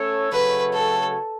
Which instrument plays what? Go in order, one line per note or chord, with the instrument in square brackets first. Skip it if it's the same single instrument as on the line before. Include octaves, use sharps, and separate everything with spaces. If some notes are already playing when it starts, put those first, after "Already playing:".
Already playing: [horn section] A3 C#4 A4 C#5
[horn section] C#3 F#3 A3 F#4 C#5 [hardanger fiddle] B4
[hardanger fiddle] A4